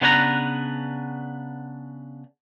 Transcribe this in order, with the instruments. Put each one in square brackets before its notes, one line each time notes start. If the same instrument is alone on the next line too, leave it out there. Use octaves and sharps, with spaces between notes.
[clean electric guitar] C#3 B3 D4 B4 C#5 A#5